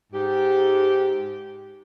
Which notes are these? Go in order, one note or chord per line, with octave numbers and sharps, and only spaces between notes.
G#2 G4